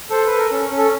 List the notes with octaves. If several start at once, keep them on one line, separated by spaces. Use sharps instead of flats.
A4 C5
B4
A4
A#4
C#4 A4
C#4
A4